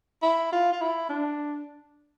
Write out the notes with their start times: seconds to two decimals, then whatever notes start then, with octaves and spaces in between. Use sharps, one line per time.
0.22 E4
0.52 F4
0.73 F4
0.81 E4
1.09 D4